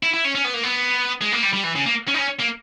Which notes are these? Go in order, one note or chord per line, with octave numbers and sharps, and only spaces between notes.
E4
E4
C#4
C#4
B3
A#3
B3
G#3
A#3
G3
G3
E3
C#3
A#3
C#4
D#4
C#4
A#3